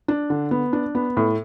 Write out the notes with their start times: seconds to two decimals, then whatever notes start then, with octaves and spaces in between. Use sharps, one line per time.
0.08 D4
0.30 D3
0.51 B3
0.73 D4
0.95 B3
1.17 A2